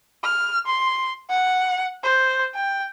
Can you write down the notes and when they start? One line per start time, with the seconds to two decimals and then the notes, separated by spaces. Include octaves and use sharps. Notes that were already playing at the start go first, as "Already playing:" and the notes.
0.24 F6
0.66 C6
1.29 F#5
2.03 C5
2.54 G5